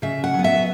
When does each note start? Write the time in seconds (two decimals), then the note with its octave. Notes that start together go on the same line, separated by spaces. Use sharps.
0.02 C#3 E5
0.24 F#5
0.34 F#3 B3
0.44 E5